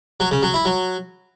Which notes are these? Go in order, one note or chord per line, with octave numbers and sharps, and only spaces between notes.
F#3
C#3
F#3
E4
F#3